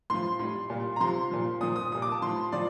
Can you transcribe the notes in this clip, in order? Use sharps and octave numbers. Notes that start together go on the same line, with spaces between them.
A2 F3 C6
A2 G3
A#2 G3
A#5
C3 F3 C6
A#2 F3
A#2 F3 D#6
D#6
A#2 G3 D#6
D6
A5
A2 F3 C6
A2 F3 D5